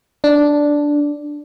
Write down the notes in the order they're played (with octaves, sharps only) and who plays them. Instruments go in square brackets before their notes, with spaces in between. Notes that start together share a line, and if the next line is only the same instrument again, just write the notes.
[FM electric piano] D4